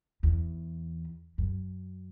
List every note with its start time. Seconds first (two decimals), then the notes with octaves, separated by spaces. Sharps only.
0.23 E2
1.38 F#2